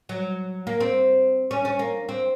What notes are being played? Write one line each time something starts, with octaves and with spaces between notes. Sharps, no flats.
F#3
A#3
C4
C#4
C#4
A#3
C4